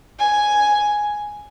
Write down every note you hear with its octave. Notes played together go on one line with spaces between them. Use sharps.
G#5